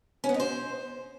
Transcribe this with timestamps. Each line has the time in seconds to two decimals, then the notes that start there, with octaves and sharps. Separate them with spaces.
0.24 C#4
0.29 B3
0.34 D#4
0.40 C5